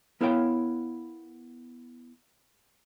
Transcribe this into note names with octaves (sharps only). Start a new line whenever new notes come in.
B3 E4 A#4 C#5 F5 G5